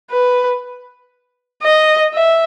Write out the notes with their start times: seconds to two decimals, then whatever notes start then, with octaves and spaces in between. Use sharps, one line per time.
0.11 B4
1.63 D#5
2.14 E5